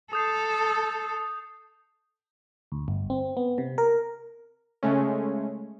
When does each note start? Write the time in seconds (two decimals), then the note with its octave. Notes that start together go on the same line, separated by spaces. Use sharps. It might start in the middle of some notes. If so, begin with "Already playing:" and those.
0.13 A4 D#6 G6 C7
2.72 D2
2.88 G1
3.10 C4
3.37 B3
3.58 C3
3.78 A#4
4.83 C#3 G#3 A3 C#4